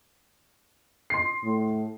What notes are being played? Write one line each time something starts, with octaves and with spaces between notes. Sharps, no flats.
C6 C7
A2